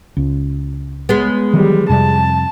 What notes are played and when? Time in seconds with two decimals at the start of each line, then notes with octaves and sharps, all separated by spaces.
0.17 C#2
1.09 G#3 B3
1.54 D#3 E3 F#3 G3
1.89 F2 C3 G3 A5